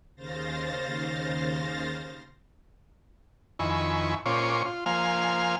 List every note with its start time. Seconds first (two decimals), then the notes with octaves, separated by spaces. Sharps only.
0.16 D#2 C#3 C5 F5 A6 A#6
3.59 F2 D#3 E4 G#5 B5 C#6
4.26 A#2 C#4 F4 C5 C#5 D6
4.65 F4
4.86 F3 A#3 C5 F5 G#5 F6